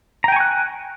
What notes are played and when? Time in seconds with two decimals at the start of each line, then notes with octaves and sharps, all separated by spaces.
0.24 A#5
0.28 G5
0.32 G#5
0.36 C#6
0.40 F#6